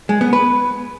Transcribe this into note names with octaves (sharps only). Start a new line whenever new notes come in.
G#3
B3
B4